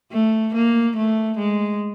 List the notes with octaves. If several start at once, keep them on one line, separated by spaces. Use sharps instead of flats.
A3
A#3
A3
G#3